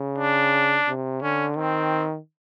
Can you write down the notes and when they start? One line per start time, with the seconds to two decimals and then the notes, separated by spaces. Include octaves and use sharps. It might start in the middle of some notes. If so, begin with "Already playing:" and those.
Already playing: C#3
0.19 D4
0.88 C3
1.22 D3 C#4
1.56 D#3 C4